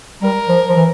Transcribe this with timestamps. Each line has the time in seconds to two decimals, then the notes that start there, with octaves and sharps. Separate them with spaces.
0.22 G3 A#4
0.48 F3
0.69 F3
0.76 E3